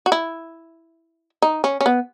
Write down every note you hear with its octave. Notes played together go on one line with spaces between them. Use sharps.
F#4
E4
D#4
C#4
C#4
B3